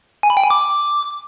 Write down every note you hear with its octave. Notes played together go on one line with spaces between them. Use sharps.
G#5
B5
G5
G#5
D6